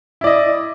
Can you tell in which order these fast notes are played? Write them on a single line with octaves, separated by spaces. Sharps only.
E4 D5 D#5